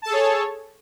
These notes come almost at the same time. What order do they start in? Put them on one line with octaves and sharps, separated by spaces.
A5 A4 G#4 C#5